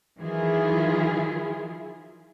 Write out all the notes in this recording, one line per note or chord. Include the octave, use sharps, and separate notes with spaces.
D#3 E3 F#3 E4 F4 G#4